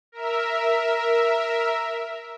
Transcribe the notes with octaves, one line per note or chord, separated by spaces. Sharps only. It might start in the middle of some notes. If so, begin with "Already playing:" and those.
A#4 E5